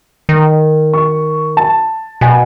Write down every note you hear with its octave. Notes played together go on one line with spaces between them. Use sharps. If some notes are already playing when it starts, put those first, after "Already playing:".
D#3
C#6
A5
B2 G#5